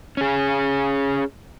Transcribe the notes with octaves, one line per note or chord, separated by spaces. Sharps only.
C#4 G#4